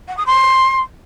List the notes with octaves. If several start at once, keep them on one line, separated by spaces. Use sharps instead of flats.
F#5
D#6
C6